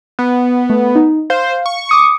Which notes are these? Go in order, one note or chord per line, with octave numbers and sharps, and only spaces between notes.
B3
A3
D#4
C5 F5
C#6
D6 D#6 C#7